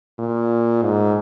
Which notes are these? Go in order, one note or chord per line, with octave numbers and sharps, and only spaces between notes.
A#2
G#2